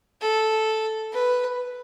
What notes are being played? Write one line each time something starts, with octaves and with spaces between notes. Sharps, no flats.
A4
B4